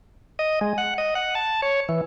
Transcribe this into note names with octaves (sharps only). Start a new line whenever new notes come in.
D#5
G#3
F#5
D#5
F#5
A5
C#5
E3